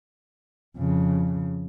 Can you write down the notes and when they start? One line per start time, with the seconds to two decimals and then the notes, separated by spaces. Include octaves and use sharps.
0.77 F2 C#3